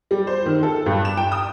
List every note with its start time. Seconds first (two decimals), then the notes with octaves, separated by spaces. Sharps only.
0.11 G3
0.27 C5
0.46 D#3
0.63 A4
0.86 G2
1.05 E7
1.17 G5
1.32 D#6